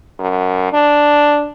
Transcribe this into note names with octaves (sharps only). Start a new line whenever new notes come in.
F#2
D4